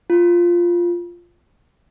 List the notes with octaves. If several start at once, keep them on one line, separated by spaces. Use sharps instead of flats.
F4